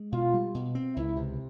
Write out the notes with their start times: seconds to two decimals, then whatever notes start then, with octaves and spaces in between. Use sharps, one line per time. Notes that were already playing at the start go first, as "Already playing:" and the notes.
Already playing: G#3
0.12 B2 F4
0.34 G3
0.55 B2
0.75 C4
0.95 C#2 E4
1.16 C3